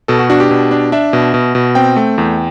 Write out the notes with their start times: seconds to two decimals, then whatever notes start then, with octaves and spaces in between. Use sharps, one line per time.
0.08 B2 A4
0.19 F#4
0.30 D4 F#4
0.40 G4
0.51 B2
0.71 D4
0.92 D4 E5
1.13 B2
1.34 B2
1.55 B2
1.75 C4 G5
1.96 A3
2.18 E2